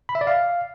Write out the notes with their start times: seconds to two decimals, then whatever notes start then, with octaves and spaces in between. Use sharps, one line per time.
0.09 B5
0.15 E5
0.21 D5
0.27 F5